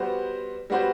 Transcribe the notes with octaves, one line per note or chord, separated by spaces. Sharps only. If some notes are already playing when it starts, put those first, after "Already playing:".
Already playing: G3 B3 F#4 C5
G3 B3 F#4 C5